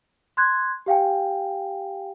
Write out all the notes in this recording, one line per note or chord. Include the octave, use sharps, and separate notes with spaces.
C6 F#6 G#6
G4 F5 G5 G#5